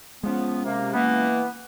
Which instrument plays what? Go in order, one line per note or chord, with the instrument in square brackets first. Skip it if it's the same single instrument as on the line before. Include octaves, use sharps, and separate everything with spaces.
[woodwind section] F3 B3 [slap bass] G#3 C#4
[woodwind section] C3 [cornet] A#3
[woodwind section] E3 A#3 [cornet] B3